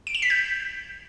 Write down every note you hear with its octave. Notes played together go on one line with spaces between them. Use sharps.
D7
E7
B6
G6